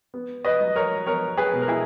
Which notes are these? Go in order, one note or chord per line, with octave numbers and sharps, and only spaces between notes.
B3
B4 D#5
F#3
A#4 C#5
B3 A#4 C#5
G#4 B4
B2
A#4
E4 G#4